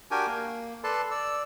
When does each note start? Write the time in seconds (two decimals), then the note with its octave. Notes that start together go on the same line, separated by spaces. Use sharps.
0.11 D4 F#4 G4 A#4 G5 G#5
0.27 A#3
0.84 A4 B4 D5 A5 C6
1.11 D5 E6